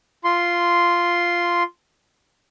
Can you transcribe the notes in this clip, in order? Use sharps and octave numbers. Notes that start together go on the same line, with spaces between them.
F4 C6